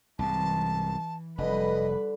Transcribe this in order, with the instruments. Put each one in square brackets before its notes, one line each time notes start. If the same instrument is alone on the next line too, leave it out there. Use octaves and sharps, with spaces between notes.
[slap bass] C2 G#2 [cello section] E3 [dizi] A5
[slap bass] F1 [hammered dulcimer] D3 [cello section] G3 B4 [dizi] D#5